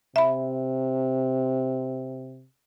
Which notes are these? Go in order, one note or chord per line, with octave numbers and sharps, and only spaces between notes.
C3 E5 B5